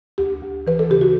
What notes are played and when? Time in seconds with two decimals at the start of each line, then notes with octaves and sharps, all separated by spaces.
0.18 D2 G4
0.42 D2
0.67 E3 B4
0.79 A4
0.90 C#3 G4
1.01 F#4